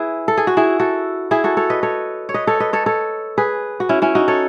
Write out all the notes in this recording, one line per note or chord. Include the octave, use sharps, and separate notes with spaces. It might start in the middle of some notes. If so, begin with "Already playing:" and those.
Already playing: E4 G#4 B4
A4
G#4
F#4
E4 G#4
F#4 A4
E4 G#4
F#4 A4
A4 C#5
B4 D#5
A4 C#5
C#5
B4 D#5
A4 C#5
B4 D#5
A4 C#5
A4 C#5
G#4 B4
F#4
C#4 E4
C#4 E4
D#4 F#4
A4 C#5